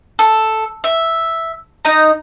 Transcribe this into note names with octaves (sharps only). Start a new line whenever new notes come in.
A4
E5
D#4 D#5 A#5